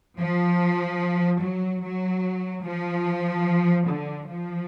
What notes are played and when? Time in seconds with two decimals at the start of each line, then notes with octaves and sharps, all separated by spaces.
0.19 F3
1.42 F#3
1.83 F#3
2.65 F3
3.88 D3
4.29 F3